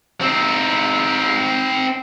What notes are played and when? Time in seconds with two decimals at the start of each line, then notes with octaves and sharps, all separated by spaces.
0.21 C4 D#4